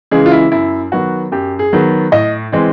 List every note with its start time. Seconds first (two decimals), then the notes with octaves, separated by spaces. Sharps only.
0.11 C#3 E3 G#3 G#4
0.26 F4
0.32 E4
0.52 F#2 E4
0.92 D#3 F#3 B3 F#4
1.32 F#2 G4
1.59 G#4
1.73 D#3 F#3 B3
2.12 A2 D#5
2.52 E3 G#3 C4